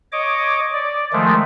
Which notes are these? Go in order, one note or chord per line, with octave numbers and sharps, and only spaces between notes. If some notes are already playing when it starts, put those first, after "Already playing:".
C#5 D#5 D6
D5
D#3 F3 G#3 A3